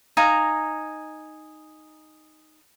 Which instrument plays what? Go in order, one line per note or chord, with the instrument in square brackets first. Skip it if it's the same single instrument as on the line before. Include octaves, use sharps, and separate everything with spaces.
[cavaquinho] D#4 F5 G#5 A#5